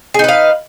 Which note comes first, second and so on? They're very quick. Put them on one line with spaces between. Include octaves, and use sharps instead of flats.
G#4 D#4 B4 F5